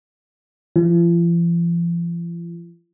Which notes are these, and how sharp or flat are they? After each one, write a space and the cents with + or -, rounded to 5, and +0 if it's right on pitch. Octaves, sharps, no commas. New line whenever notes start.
F3 -45